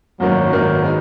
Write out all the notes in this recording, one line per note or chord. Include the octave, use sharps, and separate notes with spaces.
G#1 F#2 D#3 F#3 A#3
G#1 F#2 D#3 A#3
D#3 G#3 B3 D#4